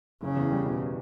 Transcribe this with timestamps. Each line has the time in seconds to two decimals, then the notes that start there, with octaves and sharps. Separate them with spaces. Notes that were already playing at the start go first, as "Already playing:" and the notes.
0.22 F#1 C#3
0.37 E2
0.51 G3
0.65 B2